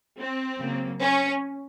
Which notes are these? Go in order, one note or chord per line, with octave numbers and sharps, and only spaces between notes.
C4
C#3 F#3 A#3
C#4